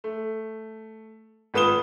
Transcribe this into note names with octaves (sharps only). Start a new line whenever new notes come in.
A3
G#1 F4 B4 D#6 E7 G7